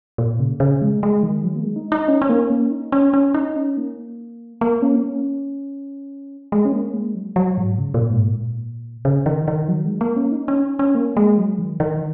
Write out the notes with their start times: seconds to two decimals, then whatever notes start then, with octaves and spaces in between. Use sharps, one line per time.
0.18 A#2
0.39 C#3
0.60 C#3
0.82 G#3
1.03 G#3
1.23 D#3
1.44 F#3
1.56 A#3
1.61 G#3
1.76 D#4
1.92 D#4
2.08 C#4
2.22 C#4
2.29 A#3
2.50 C#4
2.71 D#4
2.92 C#4
3.14 C#4
3.34 D#4
3.56 C#4
3.77 A#3
4.61 A#3
4.82 C#4
4.96 A#3
5.04 C#4
6.52 G#3
6.65 C#4
6.73 A#3
6.94 G#3
7.15 F#3
7.36 F#3
7.58 G#2
7.78 C#3
7.94 A#2
8.10 G#2
8.26 A#2
9.05 C#3
9.26 D#3
9.48 D#3
9.68 F#3
9.84 G#3
10.01 A#3
10.16 C#4
10.32 D#4
10.48 C#4
10.79 C#4
10.95 A#3
11.17 G#3
11.38 F#3
11.59 D#3
11.80 D#3